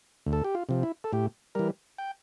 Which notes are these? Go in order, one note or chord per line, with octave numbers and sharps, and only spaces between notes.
D2
A4
G4
F4
C3 F3
E4
A4
A2 G4
E3 G3 A#4
G5